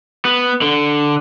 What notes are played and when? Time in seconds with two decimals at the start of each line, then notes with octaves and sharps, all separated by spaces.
0.25 B3
0.62 D3